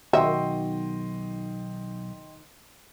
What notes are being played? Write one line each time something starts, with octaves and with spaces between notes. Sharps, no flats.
B1 D#3 F#4 D#5 E5 G5 C6